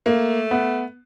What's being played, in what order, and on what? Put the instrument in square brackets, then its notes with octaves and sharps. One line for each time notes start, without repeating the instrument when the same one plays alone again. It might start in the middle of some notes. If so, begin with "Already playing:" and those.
[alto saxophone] A3 [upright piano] A#3
[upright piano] B3